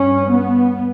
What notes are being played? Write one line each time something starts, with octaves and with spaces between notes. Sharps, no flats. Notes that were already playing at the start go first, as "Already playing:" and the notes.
Already playing: G2 C#4
B3